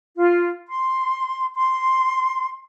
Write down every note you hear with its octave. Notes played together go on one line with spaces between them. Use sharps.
F4
C6
C6